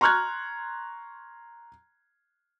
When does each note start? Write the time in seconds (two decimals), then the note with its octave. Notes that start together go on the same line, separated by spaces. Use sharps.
0.01 A#5 C6 C#6 F6 F#6 G#6